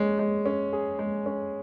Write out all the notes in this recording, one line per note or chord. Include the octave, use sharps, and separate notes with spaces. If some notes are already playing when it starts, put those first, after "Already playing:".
Already playing: G#3 C#4
G#3
C#4
G#4
G#3
C#4